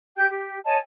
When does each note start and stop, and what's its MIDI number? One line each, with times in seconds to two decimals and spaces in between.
0.16 0.25 67
0.16 0.25 79
0.16 0.25 91
0.28 0.57 67
0.64 0.76 73
0.64 0.76 75
0.64 0.76 80
0.64 0.76 81